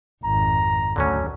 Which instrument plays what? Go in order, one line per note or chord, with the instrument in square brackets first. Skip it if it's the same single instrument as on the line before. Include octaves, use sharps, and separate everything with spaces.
[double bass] G#1 F2 [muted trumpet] A#5
[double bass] D2 [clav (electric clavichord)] D3 F#3 C#4